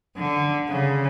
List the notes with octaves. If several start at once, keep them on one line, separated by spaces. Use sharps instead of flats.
D3
C#3